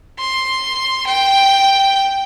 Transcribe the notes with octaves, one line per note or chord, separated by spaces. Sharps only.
C6
G5